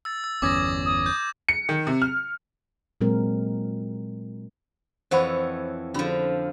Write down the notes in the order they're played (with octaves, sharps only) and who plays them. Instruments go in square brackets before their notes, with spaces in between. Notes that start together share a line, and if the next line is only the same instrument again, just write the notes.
[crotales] E6 A6
E6
[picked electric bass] G1 E2 C#4 [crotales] D6 G#6 A#6 [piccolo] D#6
[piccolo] D#6
[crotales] G6
[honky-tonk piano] C#7
D#3
C3
F6
[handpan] A#2 F#3 G#3 C4 A#4
[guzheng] F2 E3 C#5 [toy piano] C5 F#5 B5
[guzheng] D3 F3 [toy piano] C#4 F#4 B5